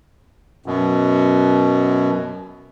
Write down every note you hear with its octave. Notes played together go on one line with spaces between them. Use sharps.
F#2 B2